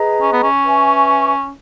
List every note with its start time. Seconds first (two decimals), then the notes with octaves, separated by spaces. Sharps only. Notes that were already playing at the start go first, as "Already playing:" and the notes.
Already playing: G#4 B4 D#5 A#5
0.21 C#4
0.32 B3
0.43 C#4
0.64 B4 E5 G#5 C#6